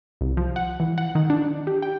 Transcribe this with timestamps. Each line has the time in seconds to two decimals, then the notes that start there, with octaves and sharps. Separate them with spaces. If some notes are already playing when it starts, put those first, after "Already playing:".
0.21 C2
0.37 F3
0.56 F#5
0.80 E3
0.98 F#5
1.15 D#3
1.30 D4
1.67 G4
1.82 G5